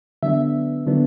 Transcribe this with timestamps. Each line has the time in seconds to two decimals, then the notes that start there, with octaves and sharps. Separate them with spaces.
0.23 D3 F#3 B3 D4 E5
0.86 D3 F#3 B3 D4